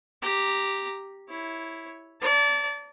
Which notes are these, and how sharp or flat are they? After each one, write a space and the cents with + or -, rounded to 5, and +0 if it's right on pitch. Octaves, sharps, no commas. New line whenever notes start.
G4 +0 A#5 +0
E4 -5 C#5 +0
D5 -30 A5 +30